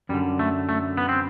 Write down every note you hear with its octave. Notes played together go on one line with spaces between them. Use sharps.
F#2 D3 G3
A3
A3
B3
C4